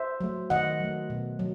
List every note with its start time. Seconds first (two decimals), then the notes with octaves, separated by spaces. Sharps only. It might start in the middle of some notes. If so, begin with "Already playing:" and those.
Already playing: C5 E5
0.20 F#3 A3
0.50 D#3 D#5 F#5
0.80 F#3 A3
1.10 B2
1.39 F#3